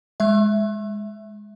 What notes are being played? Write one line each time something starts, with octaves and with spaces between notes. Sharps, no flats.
G#3 E5